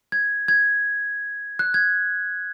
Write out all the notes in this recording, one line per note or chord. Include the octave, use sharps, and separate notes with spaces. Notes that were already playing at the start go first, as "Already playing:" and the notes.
G#6
G#6
F#6
G#6